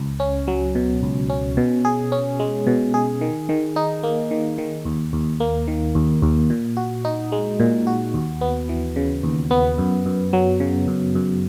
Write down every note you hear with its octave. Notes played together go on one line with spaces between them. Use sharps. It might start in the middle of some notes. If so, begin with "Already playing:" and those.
Already playing: C#2
C#4
F#3
B2
C#2
C#4
B2
G#4
C#4
G#3
B2
G#4
D#3
D#3
D#4
A#3
D#3
D#3
D#2
D#2
A#3
D#3
D#2
D#2
A#2
F#4
D#4
G#3
A#2
F#4
D#2
B3
E3
C#3
D#2
B3
F#2
F#2
F#3
C#3
F#2
F#2